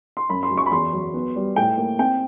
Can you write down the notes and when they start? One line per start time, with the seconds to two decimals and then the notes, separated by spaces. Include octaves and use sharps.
0.17 C6
0.29 F#2 B5
0.43 C6
0.50 F#3
0.57 C#6
0.66 B5
0.71 E2 C6
0.93 F#3
1.14 B3
1.36 G3
1.56 A2 G5
1.78 A#3
1.99 C4 G5